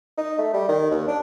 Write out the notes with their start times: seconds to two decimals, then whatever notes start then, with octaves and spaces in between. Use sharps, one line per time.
0.18 D#4
0.38 A3
0.54 G3
0.69 D#3
0.91 D#2
1.08 D4